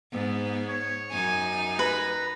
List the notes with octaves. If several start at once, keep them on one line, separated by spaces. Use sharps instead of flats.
G#2 B3
C#5
F#2 D#4 G#5
B4 A#5